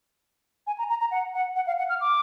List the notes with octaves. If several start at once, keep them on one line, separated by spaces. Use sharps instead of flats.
G#5
A#5
A#5
A#5
F#5
F#5
F#5
F5
F#5
F6
D6